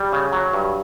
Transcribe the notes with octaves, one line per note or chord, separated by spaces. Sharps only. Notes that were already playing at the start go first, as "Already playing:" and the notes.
Already playing: G3
C#3
F#3
G2